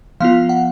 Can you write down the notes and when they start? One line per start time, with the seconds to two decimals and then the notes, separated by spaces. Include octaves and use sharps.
0.20 F3 B3 F4 F5
0.49 F#5